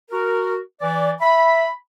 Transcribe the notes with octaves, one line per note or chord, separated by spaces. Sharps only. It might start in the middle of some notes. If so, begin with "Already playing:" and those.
F#4 A#4
E3 D5
E5 B5